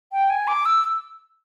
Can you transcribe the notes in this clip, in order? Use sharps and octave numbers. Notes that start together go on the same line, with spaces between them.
G5
G#5
D6
E6